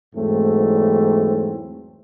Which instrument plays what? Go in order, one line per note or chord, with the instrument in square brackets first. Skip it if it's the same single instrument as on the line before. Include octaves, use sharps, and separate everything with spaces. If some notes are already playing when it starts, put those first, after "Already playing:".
[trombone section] E2 G#2 E3 F#3 A3 C4